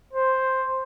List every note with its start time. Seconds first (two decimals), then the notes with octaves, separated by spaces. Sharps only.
0.13 C5